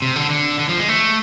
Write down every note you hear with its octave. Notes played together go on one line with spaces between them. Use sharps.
C3
D3
D3
D3
F3
G#3
A3